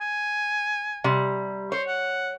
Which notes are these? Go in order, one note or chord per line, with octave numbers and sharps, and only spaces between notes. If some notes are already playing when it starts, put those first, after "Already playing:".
G#5
C3 G3
C5 C#5
F#5